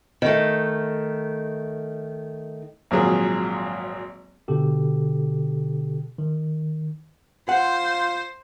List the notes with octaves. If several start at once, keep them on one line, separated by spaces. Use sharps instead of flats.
D#3 A3
G#1 A#2 F3 F#3 G#4
B2 D3 G4 A4
D#3
F4 C5 F#5